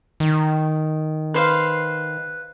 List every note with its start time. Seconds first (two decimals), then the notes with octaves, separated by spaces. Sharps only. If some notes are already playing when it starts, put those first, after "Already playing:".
0.20 D#3
1.34 B4 C5 F5